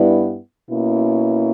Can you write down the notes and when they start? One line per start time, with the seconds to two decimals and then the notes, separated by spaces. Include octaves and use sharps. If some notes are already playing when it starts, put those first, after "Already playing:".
Already playing: G2 G3 B3 E4
0.70 B2 A#3 C#4 E4